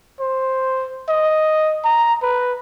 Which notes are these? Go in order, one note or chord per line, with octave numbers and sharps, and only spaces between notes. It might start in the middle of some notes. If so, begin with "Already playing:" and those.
C5
D#5
A#5
B4